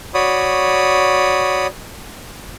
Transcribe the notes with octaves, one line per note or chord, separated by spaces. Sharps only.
F#4 C#5 D5 B5 D#6